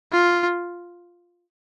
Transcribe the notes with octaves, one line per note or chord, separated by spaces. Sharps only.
F4